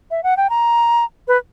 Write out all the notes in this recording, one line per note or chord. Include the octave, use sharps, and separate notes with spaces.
E5
F#5
G5
A#5
B4